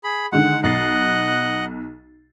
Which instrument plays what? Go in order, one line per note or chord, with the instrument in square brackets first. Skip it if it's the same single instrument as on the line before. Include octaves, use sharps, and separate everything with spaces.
[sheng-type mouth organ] G#4 B5
[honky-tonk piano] D3 D#3 G#3 [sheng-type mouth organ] F#5
[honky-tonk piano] B1 A6 C7 [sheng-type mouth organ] D#5 F#5 F#6